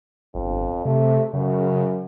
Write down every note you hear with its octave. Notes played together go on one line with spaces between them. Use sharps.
G1 F2
C3 A3
F#2 C#3